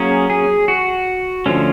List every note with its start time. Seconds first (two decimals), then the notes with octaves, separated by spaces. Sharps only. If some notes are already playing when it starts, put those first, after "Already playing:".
Already playing: F#3 A#3 C#4 G#4
0.30 G#4
0.68 F#4
1.46 D3 F3 A3 C#4